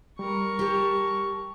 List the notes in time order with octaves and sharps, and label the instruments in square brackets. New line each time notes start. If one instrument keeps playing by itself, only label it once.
[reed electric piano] G3 [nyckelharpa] A#4 C#6
[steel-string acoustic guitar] G4 A5